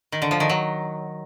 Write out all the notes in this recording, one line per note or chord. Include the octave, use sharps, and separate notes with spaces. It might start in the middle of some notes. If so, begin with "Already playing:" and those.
D#3
D3
F3
D#3
F#3